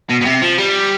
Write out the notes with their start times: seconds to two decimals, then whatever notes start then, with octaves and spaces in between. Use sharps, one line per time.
0.10 B2
0.22 B2
0.26 C3
0.43 F3
0.58 G3